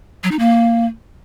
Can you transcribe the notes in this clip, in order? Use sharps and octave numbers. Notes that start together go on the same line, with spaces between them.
F#3
D#4
A#3